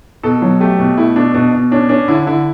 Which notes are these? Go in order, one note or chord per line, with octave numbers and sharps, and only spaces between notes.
B2 A4
F#3
A3 G4
B2
A3 E4
B2 D4
B2 D4
B2
C#4 D4
C#4 D4
D3 E4
D3 E4